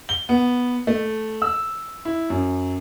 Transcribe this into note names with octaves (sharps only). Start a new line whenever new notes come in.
G7
B3
A3
E6
E4
F#2